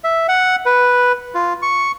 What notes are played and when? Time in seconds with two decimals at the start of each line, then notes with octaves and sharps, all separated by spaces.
0.04 E5
0.28 F#5
0.66 B4
1.35 F4
1.62 C#6